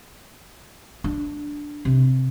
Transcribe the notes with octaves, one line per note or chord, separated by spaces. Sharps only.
D4
C3